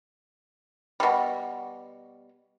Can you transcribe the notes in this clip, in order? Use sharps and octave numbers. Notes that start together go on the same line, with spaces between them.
B2 G3